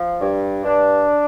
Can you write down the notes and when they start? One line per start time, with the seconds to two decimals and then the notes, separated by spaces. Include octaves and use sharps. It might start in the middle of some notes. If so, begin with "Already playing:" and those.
Already playing: F3
0.20 G2
0.64 G2 D4